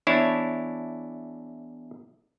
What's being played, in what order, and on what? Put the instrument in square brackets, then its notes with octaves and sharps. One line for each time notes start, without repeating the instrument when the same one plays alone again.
[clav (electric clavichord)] E2 D4 E4 C#5 A5